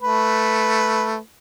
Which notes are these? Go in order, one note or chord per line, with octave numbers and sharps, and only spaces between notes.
A3 B4